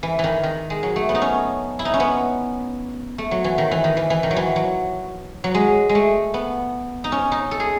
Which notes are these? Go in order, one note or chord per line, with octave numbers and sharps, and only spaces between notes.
E3
D#3 E3
D#3
G#3
F#3
A3
B3
D#4
C#4
E4
D#4
C#4
B3
A3
F#3
E3
D#3
E3
D#3
E3
E3
D#3
F#3
E3
F#3
F#3
G#3
G#3
A3
B3
D#4
C#4
D#4
A4
G#4